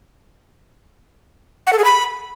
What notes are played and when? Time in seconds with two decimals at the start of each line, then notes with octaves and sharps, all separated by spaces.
1.67 F#5
1.73 A4
1.79 G#4
1.84 B5